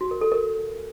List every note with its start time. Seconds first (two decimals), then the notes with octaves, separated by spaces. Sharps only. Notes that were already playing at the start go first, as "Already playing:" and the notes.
0.01 F#4
0.11 A#4
0.21 A4
0.32 A#4